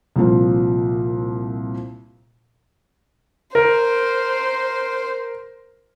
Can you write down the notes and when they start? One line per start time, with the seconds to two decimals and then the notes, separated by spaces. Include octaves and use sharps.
0.16 C2 A#2 F3
3.55 A#4 C5